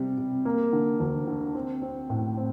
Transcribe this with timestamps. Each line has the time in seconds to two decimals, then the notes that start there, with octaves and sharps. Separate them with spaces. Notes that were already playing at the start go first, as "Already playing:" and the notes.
Already playing: C3 G3
0.18 C3
0.45 A#3
0.73 D3
1.00 D2
1.27 D3
1.55 C4
1.82 C4
2.10 A2
2.37 C4